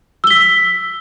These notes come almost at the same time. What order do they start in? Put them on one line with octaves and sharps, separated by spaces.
E6 G7 B6